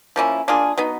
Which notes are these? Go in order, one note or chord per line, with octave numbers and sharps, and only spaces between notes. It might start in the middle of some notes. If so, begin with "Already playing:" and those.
F3 A#3 C#4 E4
A#3 D4 F4 G#4
F#3 B3 D#4